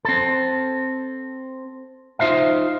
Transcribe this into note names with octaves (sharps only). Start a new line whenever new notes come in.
C4 A4
D#4 F4 C5 E5 F5